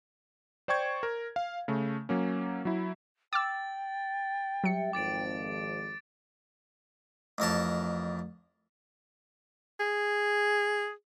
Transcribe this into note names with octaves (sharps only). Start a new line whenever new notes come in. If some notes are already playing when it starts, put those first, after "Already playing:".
C5 D5 G5 C#6 G#6
A#4
F5
C#3 A3
F#3 A#3 C#4
F#3 E4
G5 D6 E6 A6
F#3 G3 E5 C#7
G#1 F2 D6 A6 D7
A1 F2 A#4 A5
G#4